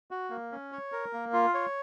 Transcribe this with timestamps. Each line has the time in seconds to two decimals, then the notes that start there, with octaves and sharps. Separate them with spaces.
0.11 F#4
0.30 A#3
0.52 C#4
0.72 C#5
0.92 A#4
1.13 A#3
1.33 F4
1.54 C#5